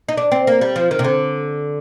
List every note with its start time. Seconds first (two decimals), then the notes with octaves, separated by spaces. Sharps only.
0.09 D#4
0.17 D4
0.32 C4
0.47 A#3
0.61 G3
0.76 F3
0.91 D#3
0.99 C3
1.04 D3